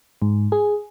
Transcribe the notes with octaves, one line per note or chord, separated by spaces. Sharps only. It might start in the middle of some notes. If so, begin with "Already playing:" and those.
G#2
G#4